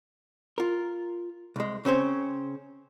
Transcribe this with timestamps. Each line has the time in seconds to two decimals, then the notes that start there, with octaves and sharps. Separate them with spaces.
0.58 F4 A#4
1.56 C2 G#3
1.85 C#3 C4 C#4 C5